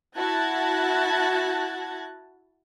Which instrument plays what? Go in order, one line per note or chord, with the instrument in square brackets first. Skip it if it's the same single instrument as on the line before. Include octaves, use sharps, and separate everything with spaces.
[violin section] E4 F#4 A5 F#6 G#6 A#6